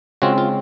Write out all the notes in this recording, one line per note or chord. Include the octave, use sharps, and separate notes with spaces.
C#3 G#3 C4 F4 F#4
F4